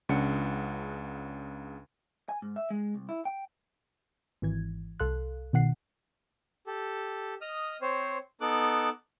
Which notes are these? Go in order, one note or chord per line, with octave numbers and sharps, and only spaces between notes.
C#2 C#3 D4 F#5 C#7
G#5
G#2
E5
G#3
C2
E4
G5
G#1 E3 G#6
C2 A4 F5 C6 F#6
B2 D#3 F#5 C7
G4 A4
D#5 D#6 F6
C4 C5 C#5
B3 D#4 A4 D6 F#6